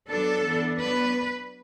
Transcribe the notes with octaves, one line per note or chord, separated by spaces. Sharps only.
F#3 B3 D4 A4
E3 B3 D4
F#3 B3 D4 B4